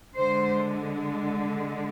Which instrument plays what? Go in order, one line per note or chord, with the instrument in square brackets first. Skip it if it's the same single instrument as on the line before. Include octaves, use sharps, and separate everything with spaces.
[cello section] D3 G#3 C5